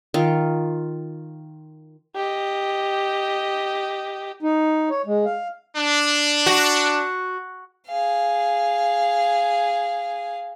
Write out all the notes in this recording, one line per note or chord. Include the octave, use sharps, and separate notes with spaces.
D#3 F4
G4 D#5
D#4
C#5
G#3
F5
D4
F#4
G#4 F5